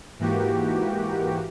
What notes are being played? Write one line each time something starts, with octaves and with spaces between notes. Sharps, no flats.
G#2 E3 A#3 F#4 G4